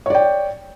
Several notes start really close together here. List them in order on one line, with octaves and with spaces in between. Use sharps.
C#5 D5 G5